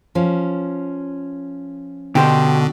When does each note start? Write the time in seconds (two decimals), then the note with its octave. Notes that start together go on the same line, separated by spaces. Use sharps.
0.15 F3 C#4
2.15 B2 D3 G4 C5 D#5